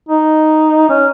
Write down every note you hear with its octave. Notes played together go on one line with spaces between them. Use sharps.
D#4
C#4